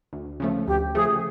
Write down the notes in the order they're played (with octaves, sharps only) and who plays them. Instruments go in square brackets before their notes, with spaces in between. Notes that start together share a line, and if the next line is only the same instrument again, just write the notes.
[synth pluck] D2
C#3 F3 A3
[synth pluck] D2 [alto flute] G4
[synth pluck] C#3 F3 A3 [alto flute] G#4